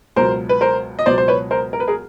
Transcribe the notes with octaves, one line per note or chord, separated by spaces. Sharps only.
C#2 B2 F#3 A#4 C5
B4
A#4 C5
D#5
C#2 B2 F#3 C5 D5
C5
B4 C#5
A#4 C5
A#4
B4
G#4 A#4